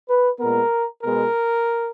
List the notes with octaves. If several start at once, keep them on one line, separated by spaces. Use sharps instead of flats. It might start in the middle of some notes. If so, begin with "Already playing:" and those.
B4
A#2 G#3 B3 A#4
B2 G#3 B3 A#4